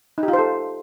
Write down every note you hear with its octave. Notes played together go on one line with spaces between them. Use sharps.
D#4
G4
F4
C5
A4